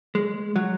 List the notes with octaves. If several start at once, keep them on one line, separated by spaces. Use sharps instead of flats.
G#3
F#3